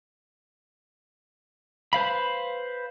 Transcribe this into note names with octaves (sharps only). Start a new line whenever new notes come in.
B4 C5 F5 B5